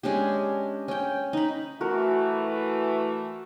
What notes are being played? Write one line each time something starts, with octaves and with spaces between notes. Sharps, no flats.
G#3 C#4 D4 G4
C#4 G5
D#4 B5
E3 A3 F#4 A#4